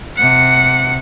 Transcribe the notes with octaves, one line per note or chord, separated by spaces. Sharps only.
C3 F#5